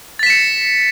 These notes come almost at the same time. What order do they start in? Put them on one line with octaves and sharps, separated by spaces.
A6 B6 E7 C#7